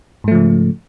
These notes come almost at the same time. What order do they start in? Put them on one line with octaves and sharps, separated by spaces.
G#2 A3 F3 C#3